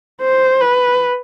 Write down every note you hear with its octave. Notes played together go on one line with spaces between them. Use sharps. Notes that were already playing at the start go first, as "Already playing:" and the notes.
C5
B4